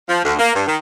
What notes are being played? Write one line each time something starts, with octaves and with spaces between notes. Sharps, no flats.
F3
D2
A#3
G2
D#3